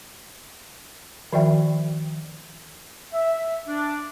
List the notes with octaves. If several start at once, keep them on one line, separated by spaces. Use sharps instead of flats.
D#3 F3 F#4 D5 E5 G5
E5
D4